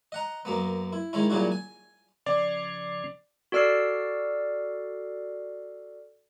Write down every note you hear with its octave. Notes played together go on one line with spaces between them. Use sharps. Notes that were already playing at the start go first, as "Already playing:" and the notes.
D#5 F#5 A#5
F#2 A#3 B3
E4
D#3 G#3 C#4 E4
A#2 C#3 F#3 G3 E4 F#4
G#5
C#3 F3 C#4 D5
F#4 A4 D5 E6 F6 C7